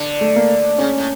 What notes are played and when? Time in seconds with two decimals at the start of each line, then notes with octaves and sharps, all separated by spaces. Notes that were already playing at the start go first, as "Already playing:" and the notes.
Already playing: D3
0.21 A3
0.36 A#3
0.78 C#3 C#4
0.98 A2